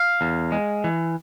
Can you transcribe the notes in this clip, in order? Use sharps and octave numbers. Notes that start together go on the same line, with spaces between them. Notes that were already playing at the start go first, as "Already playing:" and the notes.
Already playing: F5
E2
G#3
E3